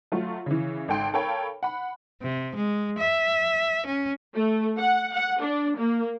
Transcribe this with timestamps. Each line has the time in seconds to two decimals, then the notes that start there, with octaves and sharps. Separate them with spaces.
0.12 F#3 A3 F4
0.46 C#3 E3
0.88 G#1 A4 G5 C6
1.14 A4 A#4 C#5 F5 G5 B5
1.63 F#5 B5
2.22 C3
2.56 G#3
2.99 E5
3.86 C#4
4.35 A3
4.78 F#5
5.13 F#5
5.42 D4
5.77 A#3